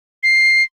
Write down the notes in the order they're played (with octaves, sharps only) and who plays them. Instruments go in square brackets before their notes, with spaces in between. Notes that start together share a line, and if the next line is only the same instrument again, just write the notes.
[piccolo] C7